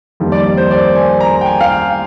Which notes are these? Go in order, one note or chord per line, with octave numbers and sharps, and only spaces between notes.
F2 D#3 G3 A#3
D5
D5
C5
D5
G#5
A#5
G5
G#5
F5
G5